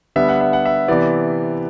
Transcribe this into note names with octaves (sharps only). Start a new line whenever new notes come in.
D3 G3 B3 E5
F#5
E5
F#5
E5
C3 E3 B3 D5